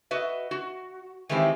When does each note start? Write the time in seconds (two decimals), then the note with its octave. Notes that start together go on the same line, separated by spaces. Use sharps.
0.11 F#4 B4 D#5 E5
0.51 F#4
1.29 D#3 E3 G#3 C4 E4 G4